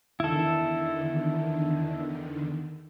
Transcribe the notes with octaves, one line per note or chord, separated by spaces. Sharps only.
E2 D3 D#3 E4 A4